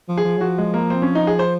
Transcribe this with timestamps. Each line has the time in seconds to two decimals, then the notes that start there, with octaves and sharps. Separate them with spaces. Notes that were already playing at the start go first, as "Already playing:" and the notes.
0.09 F3
0.17 G#4
0.25 F3
0.38 F#3
0.41 F3 F#4
0.58 G#3
0.74 A#3
0.90 C4
1.02 C#4
1.15 D#4
1.27 G#4
1.39 C5